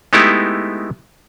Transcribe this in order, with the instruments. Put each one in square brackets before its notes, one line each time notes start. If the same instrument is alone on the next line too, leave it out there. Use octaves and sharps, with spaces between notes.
[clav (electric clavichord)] G#3 A3 B3 D#4 E4 G4